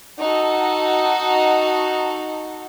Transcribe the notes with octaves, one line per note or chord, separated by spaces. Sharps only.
D#4 F#4 A4